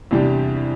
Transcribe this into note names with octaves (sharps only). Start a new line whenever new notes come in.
E2 C3 G3 D4 G4